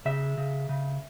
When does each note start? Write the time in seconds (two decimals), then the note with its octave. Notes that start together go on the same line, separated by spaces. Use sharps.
0.05 C#3 E5
0.38 C#3
0.69 C#3